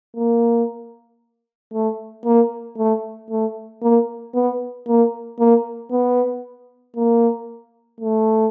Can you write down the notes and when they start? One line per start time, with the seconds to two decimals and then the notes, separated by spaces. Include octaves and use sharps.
0.17 A#3
1.74 A3
2.26 A#3
2.78 A3
3.30 A3
3.82 A#3
4.35 B3
4.88 A#3
5.39 A#3
5.91 B3
6.97 A#3
8.01 A3